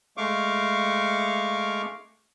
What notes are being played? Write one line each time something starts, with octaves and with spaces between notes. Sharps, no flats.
G#3 A3 F5 C#6 D6